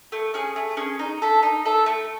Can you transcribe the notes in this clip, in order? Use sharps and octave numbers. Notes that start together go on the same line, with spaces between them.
A3
C#4 G#4
A3
C#4 G#4
D#4
A4 E5
D#4
A4 E5
A3